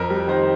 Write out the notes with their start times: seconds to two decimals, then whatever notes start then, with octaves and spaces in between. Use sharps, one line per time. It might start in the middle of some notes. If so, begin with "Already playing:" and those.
Already playing: F2 A#4
0.10 G3
0.28 D#3 C5